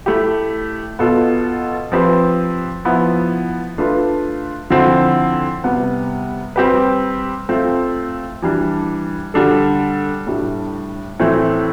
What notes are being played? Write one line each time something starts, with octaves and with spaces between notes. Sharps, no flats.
A3 E4 G4
B2 B3 F4 A4
F3 C4 G4 B4
F3 B3 E4
A3 D4 F4 B4
D3 F3 C4 E4
C3 G3 B3
G3 C4 G4 B4
A3 C4 F4
E3 G3 D4
D3 G3 D4 A4
A2 G3 D4
A2 E3 A3 C4